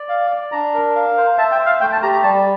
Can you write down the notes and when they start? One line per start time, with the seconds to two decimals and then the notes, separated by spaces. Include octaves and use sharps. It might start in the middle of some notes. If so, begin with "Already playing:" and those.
Already playing: D5
0.09 F5
0.31 D5
0.52 D4 A#5
0.74 A#4
0.96 F5
1.17 C5
1.38 E5 A5
1.52 G5
1.59 C5
1.66 F5
1.81 A3 G5
1.92 A5
2.02 G4 A#5
2.12 A#5
2.23 G3 A5